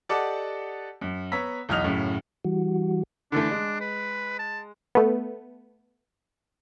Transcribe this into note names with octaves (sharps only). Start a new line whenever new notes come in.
G4 A4 D5 D#5 F#5 A5
F#2
B3 C#5 A#5 E6 B6
B1 E2 D#5 F6 F7
F#2 A2 C#3
E3 G3 F#4
D3 E3 A3 D4
G#3
B4
A5
A3 B3